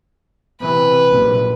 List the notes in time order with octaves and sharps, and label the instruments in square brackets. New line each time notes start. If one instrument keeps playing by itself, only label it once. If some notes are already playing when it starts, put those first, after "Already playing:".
[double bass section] C3 E3 [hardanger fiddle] B4
[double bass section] A#1 F#2 C3